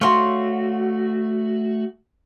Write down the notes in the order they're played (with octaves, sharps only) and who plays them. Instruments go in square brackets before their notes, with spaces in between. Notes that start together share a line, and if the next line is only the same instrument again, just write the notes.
[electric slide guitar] A3 F#4 [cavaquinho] C#5 F5 C6